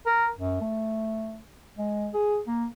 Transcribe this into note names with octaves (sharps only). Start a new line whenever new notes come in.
A#4
F#2
A3
G#3
G#4
A#3